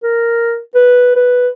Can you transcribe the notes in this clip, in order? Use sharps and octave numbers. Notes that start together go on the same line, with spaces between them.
A#4
B4
B4